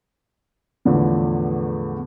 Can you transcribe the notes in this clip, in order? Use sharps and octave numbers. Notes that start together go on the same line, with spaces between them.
E2 A2 D3 F3